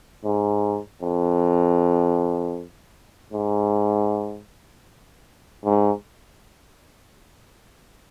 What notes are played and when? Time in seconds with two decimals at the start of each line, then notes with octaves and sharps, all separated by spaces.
0.25 G#2
1.02 F2
3.33 G#2
5.65 G#2